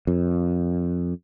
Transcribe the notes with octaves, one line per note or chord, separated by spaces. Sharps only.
F2